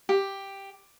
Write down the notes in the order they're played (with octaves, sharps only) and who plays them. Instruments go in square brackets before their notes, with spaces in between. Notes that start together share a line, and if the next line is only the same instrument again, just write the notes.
[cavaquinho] G4